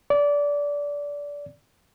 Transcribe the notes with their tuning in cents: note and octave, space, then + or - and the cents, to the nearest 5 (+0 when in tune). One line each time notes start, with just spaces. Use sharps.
D5 -20